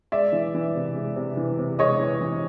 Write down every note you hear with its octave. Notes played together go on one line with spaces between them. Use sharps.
G#3 D5 E5
E3
E3
C3
G#3
C3
E3
C3
G#3 C#5 D#5
E3
E3